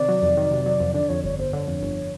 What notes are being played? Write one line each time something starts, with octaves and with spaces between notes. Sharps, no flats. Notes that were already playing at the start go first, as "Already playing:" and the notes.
Already playing: C3 D#3 D5
F#3
F2
D#3
C3
F#3
F2
D3 D5
F2 C#5
G1 C#5
G1 C5
D3 C#5
F2
G1